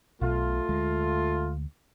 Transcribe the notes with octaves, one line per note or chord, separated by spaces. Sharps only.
B1 B2 A3 F4
D2 G#3